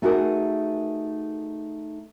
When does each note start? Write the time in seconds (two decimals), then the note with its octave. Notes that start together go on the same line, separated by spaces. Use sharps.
0.02 A3 D#4 F#4 G#4 A#4